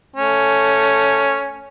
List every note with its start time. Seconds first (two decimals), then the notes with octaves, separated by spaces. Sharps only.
0.16 A3 C#4